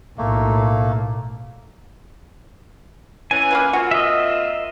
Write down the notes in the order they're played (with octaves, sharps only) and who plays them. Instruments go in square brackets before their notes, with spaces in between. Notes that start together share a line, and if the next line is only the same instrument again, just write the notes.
[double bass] B1 A2 [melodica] A3 A#3
[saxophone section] E3 C#4 [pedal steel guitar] G#5
[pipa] A#3 F4 B4
[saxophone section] A#3 C4 F4 [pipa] F#4
[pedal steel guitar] D#5 E5